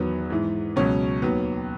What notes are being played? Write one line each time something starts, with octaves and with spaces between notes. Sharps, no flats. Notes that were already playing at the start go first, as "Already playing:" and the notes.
Already playing: E2 D#3 F#3 B3
G#2 E3
C#2 B2 F#3 C#4
D#2 D#3 F#3 B3